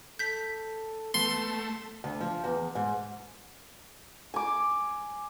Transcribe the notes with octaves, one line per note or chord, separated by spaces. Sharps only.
A4 G6 B6
A3 B3 C6
D2
F3
E2
G#2
G#5 D6